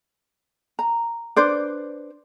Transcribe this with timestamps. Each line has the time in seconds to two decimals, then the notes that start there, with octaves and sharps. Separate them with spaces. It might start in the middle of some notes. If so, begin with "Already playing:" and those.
0.79 A#5
1.36 D4 B4 C5 D5